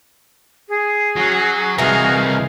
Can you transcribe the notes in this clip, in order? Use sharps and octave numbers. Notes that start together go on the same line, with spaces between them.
G#4
F#3 C#4 F#4
C2 E3 D#4 F#4 G#4 A#4 F5